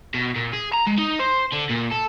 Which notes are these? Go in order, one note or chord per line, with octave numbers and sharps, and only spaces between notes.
B2
A#2
G#4
A#5
G#3
D#4
C5
D3
A#2
A4